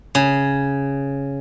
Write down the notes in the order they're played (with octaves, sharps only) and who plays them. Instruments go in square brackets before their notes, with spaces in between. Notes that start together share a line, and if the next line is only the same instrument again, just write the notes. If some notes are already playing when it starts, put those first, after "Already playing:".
[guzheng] C#3